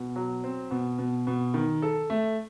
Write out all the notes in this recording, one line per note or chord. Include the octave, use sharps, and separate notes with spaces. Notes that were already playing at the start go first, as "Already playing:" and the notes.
Already playing: B2
F#3
C4
B2
B2
B2
D#3
A4
A3